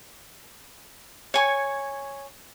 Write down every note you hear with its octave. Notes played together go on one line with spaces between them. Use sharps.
C#5 G#5 C#6